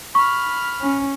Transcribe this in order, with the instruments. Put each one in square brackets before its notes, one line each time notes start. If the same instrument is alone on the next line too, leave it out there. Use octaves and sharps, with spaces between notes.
[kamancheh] B5 F6 [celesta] C#6
[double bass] C#4